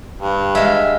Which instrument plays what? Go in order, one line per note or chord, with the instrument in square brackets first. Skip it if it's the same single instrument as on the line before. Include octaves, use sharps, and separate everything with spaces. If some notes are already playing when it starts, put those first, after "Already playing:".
[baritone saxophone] G2
[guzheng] G#3 F5 [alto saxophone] E5